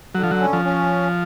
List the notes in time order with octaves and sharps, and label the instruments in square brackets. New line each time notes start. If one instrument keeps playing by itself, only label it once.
[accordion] D3 [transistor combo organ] F#3
[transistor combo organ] F3
F#3
[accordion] C#4
[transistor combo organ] F3
[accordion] C#4